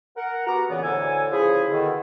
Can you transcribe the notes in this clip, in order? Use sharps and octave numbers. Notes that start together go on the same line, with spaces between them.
A#4 F#5
B3 F#4 G4 A#5
A#2 C#3 E3 B3
D2 A2 D3 A4 G#5
C#3 F3 E4 G#4
B2 D3 D#3